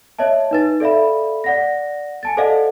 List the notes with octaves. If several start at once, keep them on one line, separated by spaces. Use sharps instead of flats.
C#5 D#5 E5 A5
D#4 B4 A6
A4 D5 E5 F5 B5
D5 F#5 A#6
G#5 A5 A6
A4 C5 D5 D#5 F5 F#5